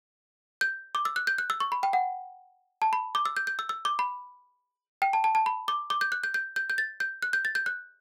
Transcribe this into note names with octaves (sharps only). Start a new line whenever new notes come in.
G6
D6
E6
F#6
G6
F#6
E6
C#6
B5
G5
F#5
A5
B5
D6
E6
G6
G6
E6
E6
D6
B5
G5
A5
A5
A5
B5
D6
D6
G6
F#6
G6
G6
G6
G6
A6
G6
F#6
G6
A6
G6
F#6